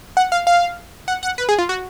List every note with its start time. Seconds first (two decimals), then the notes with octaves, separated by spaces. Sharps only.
0.17 F#5
0.32 F5
0.47 F5
1.08 F#5
1.23 F#5
1.38 B4
1.49 G#4
1.59 F4
1.69 F#4